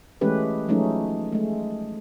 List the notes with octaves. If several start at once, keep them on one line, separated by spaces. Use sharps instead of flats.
E3 G#3 A3 C#4 G4 B4
F3 F#3 G#3 A3 C#4 D#4
G#3 A3